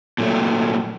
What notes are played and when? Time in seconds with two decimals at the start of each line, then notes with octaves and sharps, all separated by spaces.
0.18 A#2 F#3 A3